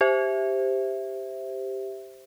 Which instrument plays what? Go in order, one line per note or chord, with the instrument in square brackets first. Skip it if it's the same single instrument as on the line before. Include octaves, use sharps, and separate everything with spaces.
[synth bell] G4 C5 E5